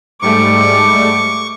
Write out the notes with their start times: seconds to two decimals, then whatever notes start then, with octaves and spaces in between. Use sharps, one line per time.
0.22 G#2 G3 A3 C#6 D6